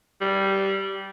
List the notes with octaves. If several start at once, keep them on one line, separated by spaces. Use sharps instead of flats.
G3